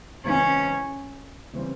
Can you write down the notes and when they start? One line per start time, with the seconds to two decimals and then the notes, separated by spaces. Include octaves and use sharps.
0.25 C#2 C#3 E3 G#3 C4 C#4
1.53 C#3 E3 G3 C4